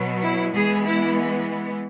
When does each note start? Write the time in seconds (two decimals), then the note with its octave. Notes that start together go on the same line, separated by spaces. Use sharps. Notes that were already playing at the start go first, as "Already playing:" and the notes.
Already playing: B2 F#3 B3
0.22 E4
0.53 E3 G#3 B3 G#4
0.84 E4